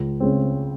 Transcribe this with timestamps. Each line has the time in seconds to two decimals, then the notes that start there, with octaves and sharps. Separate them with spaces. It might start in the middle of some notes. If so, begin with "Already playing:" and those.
Already playing: C#2
0.20 C#3 G#3 C4